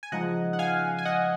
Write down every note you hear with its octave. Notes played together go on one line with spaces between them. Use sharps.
G#5
C#3 F3 G#3 D#4 D#5 F#5
F#5
F5 G#5
G#5
D#5 F#5